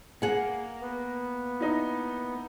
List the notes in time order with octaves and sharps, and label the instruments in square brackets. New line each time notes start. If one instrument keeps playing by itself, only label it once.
[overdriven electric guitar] A#3 [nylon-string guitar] G#4 F#5
[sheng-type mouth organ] B3
[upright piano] D#4 E4